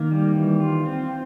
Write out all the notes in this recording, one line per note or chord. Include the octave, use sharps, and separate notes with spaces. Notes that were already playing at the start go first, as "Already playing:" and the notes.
Already playing: D#3 A#3
G3
E3
F4
C4